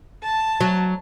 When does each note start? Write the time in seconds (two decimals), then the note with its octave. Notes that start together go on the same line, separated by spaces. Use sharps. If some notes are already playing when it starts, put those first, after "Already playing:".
0.23 A5
0.61 F#3